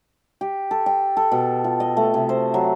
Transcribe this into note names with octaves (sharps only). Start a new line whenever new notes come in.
G4
A4
G5
A4
B2
F4
D#5
A3
C3
C5
F#3